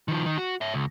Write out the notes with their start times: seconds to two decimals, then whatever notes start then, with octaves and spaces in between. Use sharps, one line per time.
0.08 D#3 F3
0.26 D#3
0.38 F#4
0.61 C#5 E5
0.74 C#2